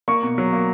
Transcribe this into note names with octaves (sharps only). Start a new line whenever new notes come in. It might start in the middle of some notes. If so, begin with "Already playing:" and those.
A#3 C#6
B2
F#3
A#3